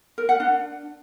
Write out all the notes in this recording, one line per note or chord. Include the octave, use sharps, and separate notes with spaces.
A#4
F#5
D4